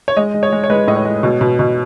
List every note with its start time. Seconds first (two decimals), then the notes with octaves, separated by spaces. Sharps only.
0.08 C#5
0.17 G#3 D#5
0.34 G#3
0.43 C#5
0.52 G#3
0.64 C#5
0.70 G#3 B4
0.88 A2 D#5
0.96 C#5
1.05 G#3
1.23 B2
1.41 B2
1.59 B2